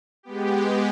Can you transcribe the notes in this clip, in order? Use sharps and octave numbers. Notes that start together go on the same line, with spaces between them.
G#3 B3 G4